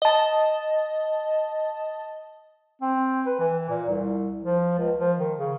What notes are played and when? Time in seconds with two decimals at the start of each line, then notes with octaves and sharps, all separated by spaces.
0.02 D#5 A5
2.82 C4
3.26 B4
3.40 E3
3.70 A#2
3.89 C2
4.43 F3
4.78 C#2
4.98 F3
5.19 D#3
5.38 C#3